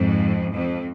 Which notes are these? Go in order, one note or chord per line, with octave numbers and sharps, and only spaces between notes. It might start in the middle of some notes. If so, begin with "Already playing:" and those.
Already playing: F2 G#2
F2